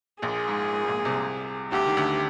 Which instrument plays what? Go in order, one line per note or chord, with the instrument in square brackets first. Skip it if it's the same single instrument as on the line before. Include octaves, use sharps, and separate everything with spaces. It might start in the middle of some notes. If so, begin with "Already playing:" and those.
[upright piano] A#1 A#2 [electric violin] G#4
[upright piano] G#2
G#2
G#2
A#1 A#2
C2 C3
[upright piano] D2 D3 [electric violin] G4
[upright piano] D#3
D2 D3